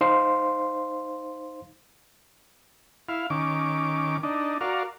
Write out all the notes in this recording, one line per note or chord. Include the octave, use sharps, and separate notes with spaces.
D#4 C5 F5 C6
E4 F5
D#3 C#4 D6
D4 D#4
F#4 A#4 D5 F5